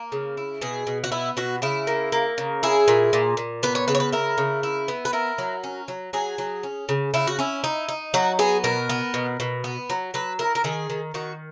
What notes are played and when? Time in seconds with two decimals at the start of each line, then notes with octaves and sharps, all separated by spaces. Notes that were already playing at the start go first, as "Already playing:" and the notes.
Already playing: A#3
0.12 C#3
0.37 E4
0.62 B2 G#4
0.87 B2
1.04 F#4
1.12 B3 E4
1.37 B2 F#4
1.62 C#3 E4
1.87 A#3
2.12 A#3
2.38 C#3
2.63 E4 G#4
2.88 A#2
3.13 A#2
3.37 A#2
3.63 B3 B4
3.75 C#5
3.88 C#3 B4
3.95 C#5
4.00 B4
4.12 E4 A#4
4.38 C#3
4.63 E4
4.88 B3
5.05 B4
5.13 E4 A#4
5.38 F#3
5.64 C#4
5.88 F#3
6.13 F#3 G#4
6.38 F#3
6.63 C#4
6.89 C#3
7.14 C#3 E4
7.27 F#4
7.39 C#4 E4
7.64 D#4
7.88 D#4
8.14 F#3 F#4
8.39 B3 G#4
8.64 B2 A#4
8.89 B3
9.14 B2
9.40 B2
9.64 B3
9.90 F#3
10.14 F#3 B4
10.39 E4 A#4
10.55 A#4
10.64 D#3 G#4
10.90 D#3
11.14 D#3 F#4